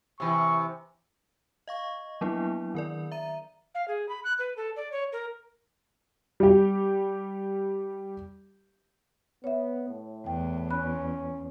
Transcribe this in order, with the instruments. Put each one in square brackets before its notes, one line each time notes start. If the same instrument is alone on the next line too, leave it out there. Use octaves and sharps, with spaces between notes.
[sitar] C3 E3 [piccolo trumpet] C#6
[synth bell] D#5 F5 C#6
F3 F#3 A#3 B3 D4 E4
D#3 A#4 D5
E5 A#5 D#7
[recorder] F5
G#4
B5
F#6
B4
A4
D5
C#5
A#4
[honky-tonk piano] G3 G4
[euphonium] B3 [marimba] C#5 E5
[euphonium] A2
[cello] E2 [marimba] G5
[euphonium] C#4 [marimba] B5 F#6